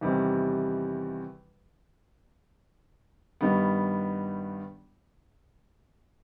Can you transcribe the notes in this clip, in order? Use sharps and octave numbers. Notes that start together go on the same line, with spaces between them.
E2 C3 D#3 G3
G2 D#3 G3 B3